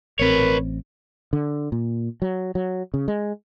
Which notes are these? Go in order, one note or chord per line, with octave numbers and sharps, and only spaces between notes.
A1 C4 A#4 B4 C#5
D3
A#2
F#3
F#3
C#3
G#3